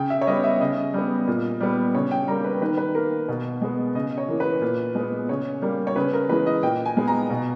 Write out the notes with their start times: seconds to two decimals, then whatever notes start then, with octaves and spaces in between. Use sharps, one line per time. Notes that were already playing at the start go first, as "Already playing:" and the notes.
Already playing: C#3 G5
0.10 E5
0.21 C#5
0.27 G3 B3 D#5
0.44 E5
0.60 C#3 D#5
0.94 G3 B3
1.28 A#2
1.61 G3 B3
1.95 C#3 C#5
2.11 G5
2.28 G3 A#3 A#5
2.44 B4
2.61 D#3 B4
2.77 B4
2.95 A#3 A#4
3.28 B2
3.62 G#3 B3
3.95 C#3 D#5
4.18 C#5
4.28 E3 A#3
4.40 B4
4.62 A#2
4.95 G#3 B3
5.29 C#3 C#5
5.62 G3 A#3
5.87 C#5
5.96 C#3 B4
6.13 A#4
6.29 E3 G#3 B4
6.46 D#5
6.63 A#2 G5
6.85 G#5
6.97 G#3 B3
7.08 A#5
7.30 B2